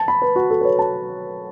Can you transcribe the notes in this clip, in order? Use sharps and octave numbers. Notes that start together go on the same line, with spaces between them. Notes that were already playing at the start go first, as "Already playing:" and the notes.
Already playing: A5
B5
B4
F#4
A4
B4
C#5
A5